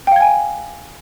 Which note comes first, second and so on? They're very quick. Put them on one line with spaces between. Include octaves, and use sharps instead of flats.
G5 F5 G#6 G#5